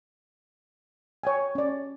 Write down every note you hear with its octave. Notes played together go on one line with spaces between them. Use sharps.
C#5 G5 G#5
C#4 D5